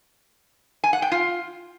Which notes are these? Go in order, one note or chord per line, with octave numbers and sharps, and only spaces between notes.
G#5
F#5
G5
F4